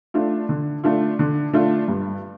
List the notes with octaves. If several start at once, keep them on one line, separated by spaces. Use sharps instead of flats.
A3 D4 F4
D3
A3 D4 F4
D3
A3 D4 F4
G2